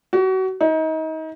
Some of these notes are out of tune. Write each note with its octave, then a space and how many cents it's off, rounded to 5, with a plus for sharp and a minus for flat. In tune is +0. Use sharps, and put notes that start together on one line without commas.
F#4 +30
D#4 +30